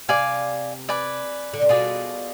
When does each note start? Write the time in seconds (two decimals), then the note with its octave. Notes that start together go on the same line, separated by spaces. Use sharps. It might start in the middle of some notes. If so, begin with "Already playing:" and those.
0.08 C3 D5 F5 G#5
0.89 B4 D5 G#5
1.54 D3
1.62 C3
1.69 B2 F4 G#4 D5